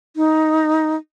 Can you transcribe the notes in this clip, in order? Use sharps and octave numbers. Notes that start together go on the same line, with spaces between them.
D#4